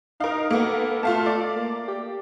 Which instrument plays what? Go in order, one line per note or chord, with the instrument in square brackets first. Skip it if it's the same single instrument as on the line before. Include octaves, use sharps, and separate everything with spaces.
[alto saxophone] D#4 [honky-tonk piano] A#4 F5
[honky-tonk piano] A#3 B3 [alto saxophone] A4
[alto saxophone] A3 [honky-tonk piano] F4 F5 A5
[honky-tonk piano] D5
[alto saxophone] A#3
G4